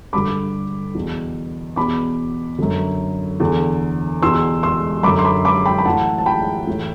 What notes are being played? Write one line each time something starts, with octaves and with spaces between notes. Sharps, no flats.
G2 D3 B5 D6
E2 B2
E2 B2 B5 D6
F#2 D3
E2 D3
E2 B2 C6 E6
C6 E6
F#2 D3 B5 D6
C6
B5 D6
B5 D6
G5 B5
B5
A2 E3 F#5 A5
A5
G5 B5
A2 E3